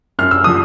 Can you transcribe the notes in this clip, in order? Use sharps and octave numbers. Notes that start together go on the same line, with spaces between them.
F#2 F6
E6
F3 D#6